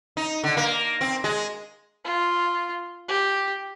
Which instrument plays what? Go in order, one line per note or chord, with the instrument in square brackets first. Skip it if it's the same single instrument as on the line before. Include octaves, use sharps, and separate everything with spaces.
[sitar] D#4
D3
A#3
C4
G#3
[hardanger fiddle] F4
G4